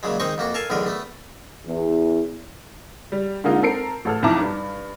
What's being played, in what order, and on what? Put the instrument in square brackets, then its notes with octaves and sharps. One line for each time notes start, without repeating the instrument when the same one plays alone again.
[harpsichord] A#2 C#3 F#3 G#3
D#3 G#3 C4 D#5 C#6
F2 A#3 F#4
A4 A#4 F5 G#5 A5
B1 E2 A2 D3 A#4 D#6
A3 B3
[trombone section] E2
[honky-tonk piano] G3
D3 G#3 A#3 D#4 F4
C4 A4 A#4 C7 D7
A1 A4 F6
B1 F2 E4 A5 A#5 D6
G2